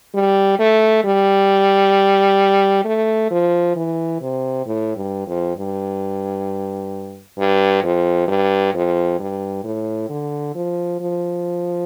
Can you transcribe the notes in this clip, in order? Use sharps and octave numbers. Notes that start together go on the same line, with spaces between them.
G3
A3
G3
A3
F3
E3
C3
A2
G2
F2
G2
G2
F2
G2
F2
G2
A2
D3
F3
F3